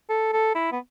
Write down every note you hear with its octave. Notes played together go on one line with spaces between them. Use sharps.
A4
A4
E4
B3